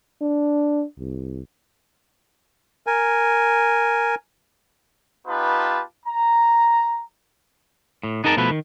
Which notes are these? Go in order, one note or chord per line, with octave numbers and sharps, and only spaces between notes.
D4
C2
A#4 G#5
B3 D#4 F4 G4 B4 A5
A#5
A2
B3 D#4 G#4 A#4 A5
B2 F3 A3 E4 B4
D#3